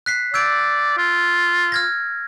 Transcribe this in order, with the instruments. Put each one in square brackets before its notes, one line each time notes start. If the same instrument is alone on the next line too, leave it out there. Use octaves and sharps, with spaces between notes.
[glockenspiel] F#6 B6 C7
[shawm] D5 [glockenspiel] E6 G6 D7
[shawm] F4
[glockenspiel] F6 G#6 A#6